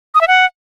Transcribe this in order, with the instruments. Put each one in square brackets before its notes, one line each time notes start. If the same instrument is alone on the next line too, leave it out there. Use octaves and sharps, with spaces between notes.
[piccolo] D#6
E5
F#5